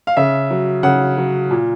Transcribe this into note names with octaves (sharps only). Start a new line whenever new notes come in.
F5
C#3 E5
F#3
C#3 F#5
F#3
A#2